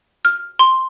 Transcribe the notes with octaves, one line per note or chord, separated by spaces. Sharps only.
F6
C6